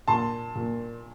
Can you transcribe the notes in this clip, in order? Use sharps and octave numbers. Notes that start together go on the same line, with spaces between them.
A#2 A5 C6
A#2